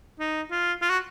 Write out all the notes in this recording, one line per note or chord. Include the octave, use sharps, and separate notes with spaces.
D#4
F4
F4
F#4